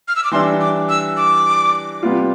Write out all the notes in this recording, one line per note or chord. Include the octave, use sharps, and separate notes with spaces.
F6
E6
D6
E3 G3 D4 C6
D6
E6
D6
C3 G3 B3 F4